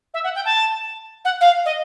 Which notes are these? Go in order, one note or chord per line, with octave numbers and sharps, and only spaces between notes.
E5
F#5
G5
A5
F#5
F5
D#5